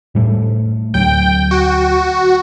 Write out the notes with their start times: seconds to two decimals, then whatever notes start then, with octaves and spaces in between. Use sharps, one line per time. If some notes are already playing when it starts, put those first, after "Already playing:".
0.15 A2 G3 A3
0.94 D2 F#3 G5
1.51 F#4